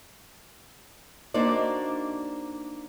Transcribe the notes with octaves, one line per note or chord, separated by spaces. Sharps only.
A#3 D4 D#4 F#4 C5 D5